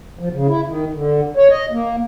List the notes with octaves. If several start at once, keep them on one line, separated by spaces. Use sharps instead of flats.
F3
C#3
E4
D#3
D3
C#5
D#5
A#3